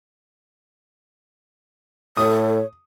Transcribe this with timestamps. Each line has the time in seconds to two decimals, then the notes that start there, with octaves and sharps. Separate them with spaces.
2.17 A2 A4 C#5 D#6